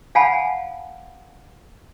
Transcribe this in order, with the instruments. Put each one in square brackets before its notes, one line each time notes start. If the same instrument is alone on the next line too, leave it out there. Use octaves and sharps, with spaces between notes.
[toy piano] F5 F#5 G#5 A5 B5